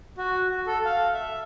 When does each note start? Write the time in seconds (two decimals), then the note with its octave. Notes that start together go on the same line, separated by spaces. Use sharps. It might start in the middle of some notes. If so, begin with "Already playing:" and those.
0.18 F#4
0.67 A4
0.85 F5
1.14 E5